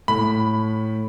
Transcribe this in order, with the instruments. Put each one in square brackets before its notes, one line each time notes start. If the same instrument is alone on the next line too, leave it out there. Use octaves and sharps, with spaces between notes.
[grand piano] A2 [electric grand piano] B5